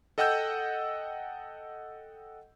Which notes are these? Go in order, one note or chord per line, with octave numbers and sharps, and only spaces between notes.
A4 D#5 F#5 G5 E6 G6